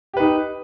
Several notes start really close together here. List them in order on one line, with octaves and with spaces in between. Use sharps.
G4 B4 D#4